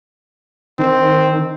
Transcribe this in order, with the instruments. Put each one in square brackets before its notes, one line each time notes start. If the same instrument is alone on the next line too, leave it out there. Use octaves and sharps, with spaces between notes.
[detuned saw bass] D#3 [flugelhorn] C4